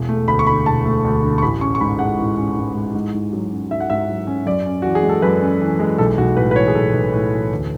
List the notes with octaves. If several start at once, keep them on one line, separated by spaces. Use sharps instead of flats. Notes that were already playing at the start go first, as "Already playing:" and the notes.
Already playing: E1
A3
D2 B5
C#6
D3 B5
E1 A5
A3
D2
D3
C#6
A1 B5
C#4 C#6
C#6
G#2 B5
G#3 F#5
A1
C#4
G#2
G#3
G#2
G#2
F#3
C#4
G#2 E5
F#5
G#2 E5
F#3
C#4
F#2 D5
C#4
E3 F#4
G#4
G#3
A4
F#2 B4
C#4
E3
G#3
B1 A4
B1 F#4
A2 B4
B4
E3 C#5
G#4
B1 A4
B1
A2
E3
D2